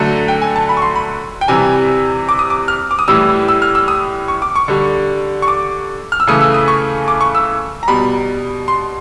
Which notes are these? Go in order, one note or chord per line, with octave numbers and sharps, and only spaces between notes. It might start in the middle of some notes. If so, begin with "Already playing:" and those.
Already playing: D3 F#3 A3
G5
G#5
A5
B5
C#6
C6
B5
G5
C3 E3 G3 G#5
D6
D#6
D6
F6
D6
D#6
A2 E3 G3 E6
E6
F6
E6
D#6
C#6
D6
C#6
D3 G3
C#6
D6
F6
E6
C#3 E3 A3 D#6
E6
D#6
C#6
D6
C#6
E6
A#5
B2 G3 B5
C6